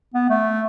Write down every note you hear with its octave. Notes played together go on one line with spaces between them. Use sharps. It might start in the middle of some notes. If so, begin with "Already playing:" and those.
B3
A3